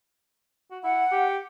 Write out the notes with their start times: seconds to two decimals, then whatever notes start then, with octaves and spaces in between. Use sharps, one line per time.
0.71 F#4
0.84 E4 F#5
1.12 G4